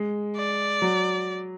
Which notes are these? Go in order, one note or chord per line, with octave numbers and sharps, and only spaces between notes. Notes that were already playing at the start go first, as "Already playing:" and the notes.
Already playing: G#3
D5
F#3